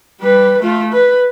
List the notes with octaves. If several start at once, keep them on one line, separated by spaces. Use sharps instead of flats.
G3 B4
A3 F4
B4